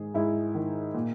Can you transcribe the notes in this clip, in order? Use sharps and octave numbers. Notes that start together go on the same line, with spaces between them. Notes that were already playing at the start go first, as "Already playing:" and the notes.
Already playing: G#2 D#3 G#4
G#2 E4
D#3
A#2